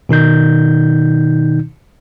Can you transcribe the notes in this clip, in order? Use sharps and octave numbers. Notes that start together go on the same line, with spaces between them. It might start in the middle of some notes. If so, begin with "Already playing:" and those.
B2 D#3 D#4 G6